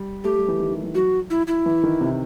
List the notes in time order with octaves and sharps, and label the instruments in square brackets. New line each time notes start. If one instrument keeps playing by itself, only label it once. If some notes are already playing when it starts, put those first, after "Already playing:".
Already playing: [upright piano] G3
[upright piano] A3 [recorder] G4
[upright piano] G3
E3
D#3
D#3
E3
[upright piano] F#3 [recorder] F#4
[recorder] E4
E4
[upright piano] E3
D#3
C3